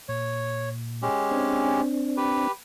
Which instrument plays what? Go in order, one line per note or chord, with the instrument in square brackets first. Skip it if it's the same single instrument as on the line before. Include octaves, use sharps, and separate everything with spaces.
[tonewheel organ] A#2 [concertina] C#5
[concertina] G#3 C#4 G4
[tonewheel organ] C4 D4
[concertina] G4 B4